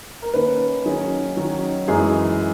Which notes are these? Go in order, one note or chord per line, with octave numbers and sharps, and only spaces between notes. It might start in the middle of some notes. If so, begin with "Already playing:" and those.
A#4
D#3 A#3 C#4 B4
D#3 F#3 C#4 G#4
D#3 F#3 C#4
F#2 E3 G#3 D#4 G#4